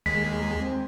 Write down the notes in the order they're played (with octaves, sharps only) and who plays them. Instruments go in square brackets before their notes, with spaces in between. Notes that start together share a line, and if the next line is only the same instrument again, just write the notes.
[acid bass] D#2 [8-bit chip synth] G#3 [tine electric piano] B6
[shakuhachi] C4